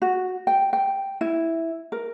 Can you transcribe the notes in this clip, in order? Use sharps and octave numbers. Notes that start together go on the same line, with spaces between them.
F#4
G5
G5
E4
A#4